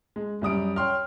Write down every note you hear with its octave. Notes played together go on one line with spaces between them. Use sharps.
G#3
F#2 G3 D#6 D7
C#5 G5 C6 F6